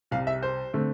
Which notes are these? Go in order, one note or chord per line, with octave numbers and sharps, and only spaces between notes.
C2 C3 G3 F5
E5
C5
D3 A3 C4